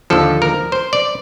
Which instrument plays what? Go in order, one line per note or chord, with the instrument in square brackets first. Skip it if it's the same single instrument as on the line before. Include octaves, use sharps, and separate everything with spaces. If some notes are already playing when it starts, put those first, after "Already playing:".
[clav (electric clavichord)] D#2 D3 F3 A4
A#4
C5
D5